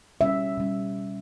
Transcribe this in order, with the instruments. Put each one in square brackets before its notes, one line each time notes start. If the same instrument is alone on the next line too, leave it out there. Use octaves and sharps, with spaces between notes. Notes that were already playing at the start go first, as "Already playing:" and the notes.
[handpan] B2 G3 C#4 E5
B2 G3 C#4